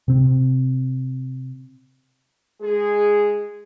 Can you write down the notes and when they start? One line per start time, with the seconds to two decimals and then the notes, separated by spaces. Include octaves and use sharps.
0.08 C3 C4
2.61 G#3 G#4